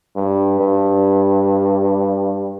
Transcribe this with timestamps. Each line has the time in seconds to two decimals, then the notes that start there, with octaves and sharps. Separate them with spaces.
0.16 G2
0.60 G2